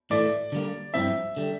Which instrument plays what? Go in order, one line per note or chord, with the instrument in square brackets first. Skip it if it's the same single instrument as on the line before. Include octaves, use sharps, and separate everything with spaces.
[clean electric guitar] A2 E3 A3 [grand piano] D5
[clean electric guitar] D3 G3 A#3
[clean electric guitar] G2 F3 C4 E4 [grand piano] E5
[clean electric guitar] D3 G3